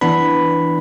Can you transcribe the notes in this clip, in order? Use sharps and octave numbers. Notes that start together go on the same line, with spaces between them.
E3 B3 D4 B4 B5